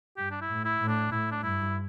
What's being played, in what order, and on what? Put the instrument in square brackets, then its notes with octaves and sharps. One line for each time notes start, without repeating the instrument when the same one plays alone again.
[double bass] G2 [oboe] G4
[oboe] D4
E4
[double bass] A2
[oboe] E4
[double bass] A2
[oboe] D4
[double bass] A2 [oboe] E4
[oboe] D4
[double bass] G2 [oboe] E4